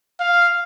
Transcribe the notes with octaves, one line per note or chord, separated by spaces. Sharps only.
F5